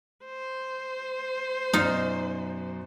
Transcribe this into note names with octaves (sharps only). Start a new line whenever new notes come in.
C5
F#2 B2 D#4 F4 D5